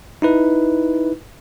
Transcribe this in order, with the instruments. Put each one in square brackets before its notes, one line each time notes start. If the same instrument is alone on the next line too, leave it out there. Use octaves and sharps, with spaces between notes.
[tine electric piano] D#4 E4 B4